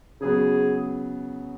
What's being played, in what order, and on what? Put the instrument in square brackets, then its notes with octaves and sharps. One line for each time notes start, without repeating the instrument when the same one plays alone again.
[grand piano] C#3 F#3 B3 [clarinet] G#4